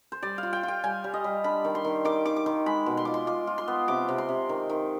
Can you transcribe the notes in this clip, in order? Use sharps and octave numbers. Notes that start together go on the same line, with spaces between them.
C5
G3 D5
F4 F5
G5
F4 G5
G3 G#5
G3
D#5
G3
D4 B5
D#3
C6
D#3
D#3 D6
D#3 D6
D6
D#3 C6
G#3 B5
B2
C6
F4 D6
C6
F4 D6
F4
C6
B3
C3 D6
C3
C6
C3
D#3
D#3